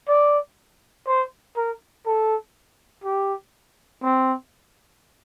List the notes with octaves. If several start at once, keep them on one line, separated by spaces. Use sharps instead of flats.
D5
C5
A#4
A4
G4
C4